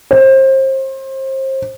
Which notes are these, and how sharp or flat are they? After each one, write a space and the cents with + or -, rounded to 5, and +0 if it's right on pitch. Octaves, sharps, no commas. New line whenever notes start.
C5 +30